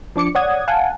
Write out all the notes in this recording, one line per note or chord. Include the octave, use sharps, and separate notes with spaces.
F3 D4 D6 C#7
C#5 D5 F#5 D#6 G#6
F5 F#5 G#5 A5